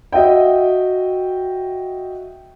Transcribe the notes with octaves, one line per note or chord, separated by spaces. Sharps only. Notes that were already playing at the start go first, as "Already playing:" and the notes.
F#4 D#5 E5 G5